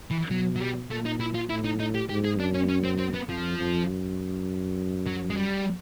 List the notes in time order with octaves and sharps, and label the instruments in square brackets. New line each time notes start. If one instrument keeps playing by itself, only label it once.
[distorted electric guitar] E3
[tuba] B2 [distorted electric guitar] F#3
[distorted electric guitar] F#3
G3
[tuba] A#2 [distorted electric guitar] A3
[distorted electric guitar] D#4
E4
F4
[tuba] A2 [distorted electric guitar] E4
[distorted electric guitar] D#4
D#4
G4
[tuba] G#2 [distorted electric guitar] G4
[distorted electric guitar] G#4
[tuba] F#2 [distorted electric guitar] D4
[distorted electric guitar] C#4
C#4
C4
C4
B3
[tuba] F2 [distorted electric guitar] F3
[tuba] F2
F#2
[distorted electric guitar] F#3
G#3
G3